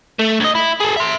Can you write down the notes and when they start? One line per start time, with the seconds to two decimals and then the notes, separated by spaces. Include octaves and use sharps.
0.20 A3
0.40 D2 D#5
0.55 E4
0.80 G#4 A4
0.97 E5 C6